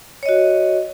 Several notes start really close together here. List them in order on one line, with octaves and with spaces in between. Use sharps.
C#5 D#5 F#4